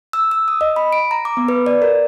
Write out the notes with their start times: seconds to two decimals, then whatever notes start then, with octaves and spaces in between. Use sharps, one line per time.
0.13 E6
0.31 E6
0.48 D#6
0.61 D#5
0.76 B5
0.93 D7
1.11 A#5
1.25 D6
1.37 B3
1.48 B4
1.66 D5
1.82 A#4